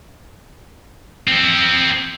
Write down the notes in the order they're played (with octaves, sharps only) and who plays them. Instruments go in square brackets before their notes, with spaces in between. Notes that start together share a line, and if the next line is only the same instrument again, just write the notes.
[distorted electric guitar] C4 A4